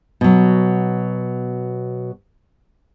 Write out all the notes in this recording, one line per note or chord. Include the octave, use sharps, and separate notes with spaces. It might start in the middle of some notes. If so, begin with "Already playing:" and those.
B2 F#3